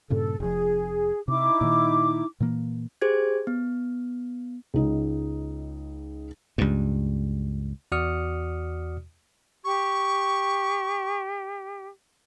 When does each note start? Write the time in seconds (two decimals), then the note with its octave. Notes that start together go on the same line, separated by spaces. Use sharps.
0.10 G2 A#2 C#3 A4
0.40 F1 F2 G#4
1.28 C3 D#4 E4 D6
1.61 A#2 D#3
2.40 A#2 E3 A#3
3.01 G4 G#4 C5 G#6
3.47 B3
4.74 C#2 D#4
6.58 C#2 G2
7.92 E2 F#4 D5 D#6 F6 C#7
9.65 G4 C#6